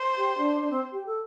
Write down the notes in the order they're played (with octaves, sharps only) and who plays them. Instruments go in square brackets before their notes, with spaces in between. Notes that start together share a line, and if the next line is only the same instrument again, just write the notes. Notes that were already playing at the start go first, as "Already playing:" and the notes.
Already playing: [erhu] C5
[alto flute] G4
D4
D4
C4
G4
A4